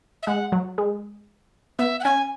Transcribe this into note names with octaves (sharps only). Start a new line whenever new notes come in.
E5
G#3 F#5
F#3
G#3
B3 E5
F#5
C#4 G#5